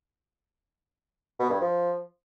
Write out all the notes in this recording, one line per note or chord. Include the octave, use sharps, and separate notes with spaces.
B2
G2
F3